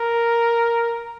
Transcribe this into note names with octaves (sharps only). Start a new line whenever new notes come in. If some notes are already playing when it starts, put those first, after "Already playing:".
Already playing: A#4